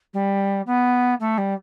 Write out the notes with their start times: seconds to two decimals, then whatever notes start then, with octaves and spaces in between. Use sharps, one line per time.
0.13 G3
0.66 B3
1.20 A3
1.38 G3